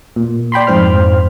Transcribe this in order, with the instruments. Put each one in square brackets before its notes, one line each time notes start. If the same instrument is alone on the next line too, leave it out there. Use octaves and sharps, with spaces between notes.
[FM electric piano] A#2
D5 G5 B5 C6
F2 G#2 C5 F6